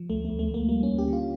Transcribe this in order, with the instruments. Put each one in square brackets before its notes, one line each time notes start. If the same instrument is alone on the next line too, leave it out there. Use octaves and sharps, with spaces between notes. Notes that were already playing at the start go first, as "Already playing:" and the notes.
Already playing: [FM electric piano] F3
D2 A3
D2 A3
A3
D2
A#3
G3 A#3
C#4
D2
G4
D3 F4